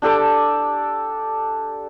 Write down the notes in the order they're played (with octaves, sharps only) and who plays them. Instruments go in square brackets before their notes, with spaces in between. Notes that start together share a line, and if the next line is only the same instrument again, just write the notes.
[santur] D4 G4 A4 D6